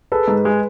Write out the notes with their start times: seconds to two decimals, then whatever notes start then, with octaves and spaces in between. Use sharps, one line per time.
0.12 G#4 A4 B4
0.28 G#2
0.45 G#3